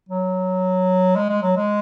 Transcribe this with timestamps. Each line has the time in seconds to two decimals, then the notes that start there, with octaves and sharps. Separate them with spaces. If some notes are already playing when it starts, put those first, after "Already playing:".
0.09 F#3
1.16 G#3
1.29 G#3
1.42 F#3
1.56 G#3